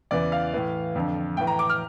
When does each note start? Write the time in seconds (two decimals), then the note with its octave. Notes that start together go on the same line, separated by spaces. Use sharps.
0.11 E2 C#3 E3 D5
0.32 F5
0.54 A2 E3
0.95 F2 D3
1.37 A2 E3 G5
1.47 A#5
1.59 D6
1.70 F6